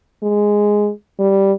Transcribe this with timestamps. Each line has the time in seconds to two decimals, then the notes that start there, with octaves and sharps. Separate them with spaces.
0.23 G#3
1.19 G3